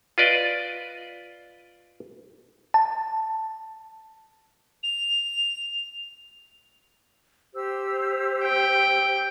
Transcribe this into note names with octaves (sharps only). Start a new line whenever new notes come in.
F4 B4 D5 D#5
A5
F7
G4 C5 E6
G5